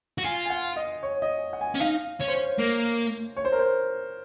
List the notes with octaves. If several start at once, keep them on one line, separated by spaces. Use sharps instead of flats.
F#4
F4 G#5
G#5
F#5
D#5
C#5
D#5
F#5
G#5
C#4
D#4 F5
C#4 C#5
C5
C#5
A#3
C#5
C5
A#4
C5